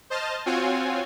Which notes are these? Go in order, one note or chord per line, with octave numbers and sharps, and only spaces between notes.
C5 D#5 A5 F6
C4 F4 F#4 C#5 G#5